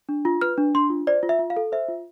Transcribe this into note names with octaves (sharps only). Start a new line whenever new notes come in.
D4
F4
B4 F6
D4
D4 C6
F4
C5 D5
F4
E5
F4
F5
A4
C5 E5
F4